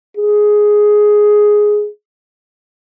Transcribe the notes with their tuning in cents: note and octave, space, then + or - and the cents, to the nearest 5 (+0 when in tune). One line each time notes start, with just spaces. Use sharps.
G#4 +5